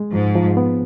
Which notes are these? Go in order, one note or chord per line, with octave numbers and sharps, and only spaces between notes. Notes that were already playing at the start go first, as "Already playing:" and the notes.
Already playing: G#3
G#2 F3
F3
B3